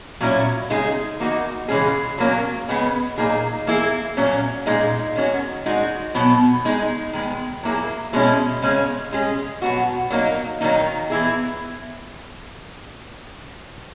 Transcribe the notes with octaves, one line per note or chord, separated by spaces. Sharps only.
A#2 F#3 C#4 E4
C#3 G#3 D#4 G#4
E3 A#3 D#4 F#4
C#3 E3 G#3 C#4 G#4
F#3 A#3 C#4
C#3 G#3 B3
A#2 F#3 A#3 D#4 G#4
E3 A#3 E4 G#4
A#2 F#3 C#4
A#2 G#3 D#4 G#4
D#3 G#3 C#4 F#4
G#3 D#4 F#4
B2 F#3 B3
G#3 D#4 G#4
D#3 G#3 B3
F#3 A#3 E4 G#4
B2 G#3 C#4 E4
C#3 G#3 C#4
G#3 C#4 G#4
B2 F#3 B3 F#4
F#3 A#3 D#4
D#3 F#3 A#3 D#4
E3 B3 E4 G#4